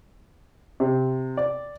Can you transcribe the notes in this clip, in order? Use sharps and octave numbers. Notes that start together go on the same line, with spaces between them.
C3
D5